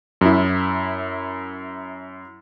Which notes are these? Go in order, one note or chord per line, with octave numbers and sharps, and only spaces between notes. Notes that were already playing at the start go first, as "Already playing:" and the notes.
F#2 E4